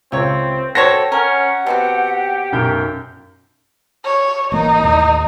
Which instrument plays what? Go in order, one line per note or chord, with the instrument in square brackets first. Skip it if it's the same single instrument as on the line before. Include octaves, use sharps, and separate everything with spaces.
[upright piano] C#2 [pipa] C3 C#5 [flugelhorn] C4
[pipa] F#4 C5 C#5 [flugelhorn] A4 [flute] G5 [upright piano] A#6
[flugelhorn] C#4 [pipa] A#4 [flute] F#5
[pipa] B2 C4 F#4 [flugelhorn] G4
[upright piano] B1 F#2 G6
[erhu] C#5
[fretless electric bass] A1 A#3 [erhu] D#4
[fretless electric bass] D#2 A2